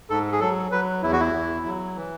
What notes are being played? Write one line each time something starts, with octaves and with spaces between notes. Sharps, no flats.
G#2 A4
G#4
F#3 A4
F#3 B4
E2 E4
F#4
E4
E2
F#3
E3